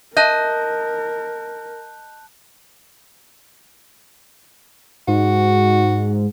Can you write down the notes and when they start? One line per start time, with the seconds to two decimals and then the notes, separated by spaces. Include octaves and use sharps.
0.17 A#4 D#5 A5 F#6 G6
5.08 G#2 F#4